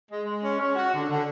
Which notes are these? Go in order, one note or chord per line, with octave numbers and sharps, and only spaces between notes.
G#3
G#3
C#4
C#4
F#4
D3
D3